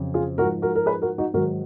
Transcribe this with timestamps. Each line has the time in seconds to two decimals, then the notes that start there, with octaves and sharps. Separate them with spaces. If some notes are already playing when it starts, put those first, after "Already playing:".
Already playing: F2 C#3 F#3
0.14 F4 G#4
0.38 G#2 F3 F#4 A#4
0.62 F#4 A#4
0.75 A#4
0.86 G#4 B4
1.02 F#4 A#4
1.18 D#4 F#4
1.34 G#2 D#3 F#3 F#4 A#4